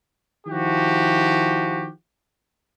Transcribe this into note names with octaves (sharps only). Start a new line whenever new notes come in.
D#3 F3 E4 F#4 G4